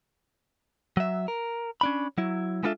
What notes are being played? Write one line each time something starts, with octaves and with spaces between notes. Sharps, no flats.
F#3 E5
A#4
C#4 D4 B5
F#3 E4
G#3 B3 D4 F4 A4 E5